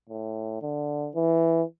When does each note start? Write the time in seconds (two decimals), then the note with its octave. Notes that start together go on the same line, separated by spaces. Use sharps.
0.09 A2
0.62 D3
1.15 E3